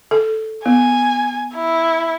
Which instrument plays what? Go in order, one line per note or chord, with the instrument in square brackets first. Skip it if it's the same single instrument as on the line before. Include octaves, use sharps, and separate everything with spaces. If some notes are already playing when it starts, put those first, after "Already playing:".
[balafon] A4
[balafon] B3 [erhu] G#5
[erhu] E4